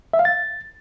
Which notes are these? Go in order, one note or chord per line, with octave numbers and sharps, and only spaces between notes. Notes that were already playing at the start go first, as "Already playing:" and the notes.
E5
F5
A6